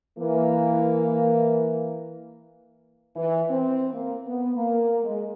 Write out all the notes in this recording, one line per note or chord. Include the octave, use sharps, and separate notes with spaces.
E3 A#3
E3
C4
A#3
B3
A#3
G#3